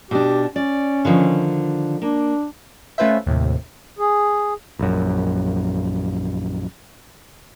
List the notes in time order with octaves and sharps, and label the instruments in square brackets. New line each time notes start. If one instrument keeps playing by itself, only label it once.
[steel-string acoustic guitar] B2 D4 [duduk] G4
[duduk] C#4 [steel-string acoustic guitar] D5
[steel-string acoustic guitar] D3 D#3 F3
[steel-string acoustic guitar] A#3 [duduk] D4
[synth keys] A3 C#4 F4 B4 C5 E5
D#2 A2 C3
[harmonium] G#4
[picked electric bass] A#1 F#2